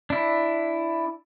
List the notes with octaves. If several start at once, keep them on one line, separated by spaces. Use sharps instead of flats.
D4 E4